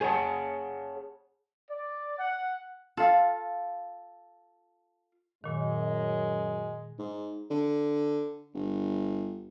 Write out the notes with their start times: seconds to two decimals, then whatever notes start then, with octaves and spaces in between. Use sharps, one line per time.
0.01 G#4 C#5 D5 F#5 A5
1.70 D5
2.18 F#5
2.97 F4 A4 F5
5.44 F#2 A#2 D#3 G#3
6.99 G#2
7.51 D3
8.54 G1